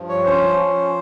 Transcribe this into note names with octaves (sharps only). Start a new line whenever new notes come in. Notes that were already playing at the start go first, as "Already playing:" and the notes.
Already playing: G2 F3
C#5
C#4 C5
F3